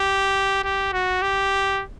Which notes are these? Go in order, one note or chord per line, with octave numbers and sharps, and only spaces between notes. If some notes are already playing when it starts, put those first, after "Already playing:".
Already playing: G4
G4
F#4
G4